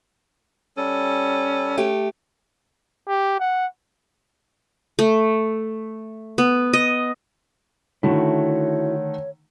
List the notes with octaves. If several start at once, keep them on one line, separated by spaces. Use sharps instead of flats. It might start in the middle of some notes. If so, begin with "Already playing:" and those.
G3 C#4 A4
A3 G4
G4
F#5
A3
B3
D#5
D3 D#3 A3 E4 F#4 C#5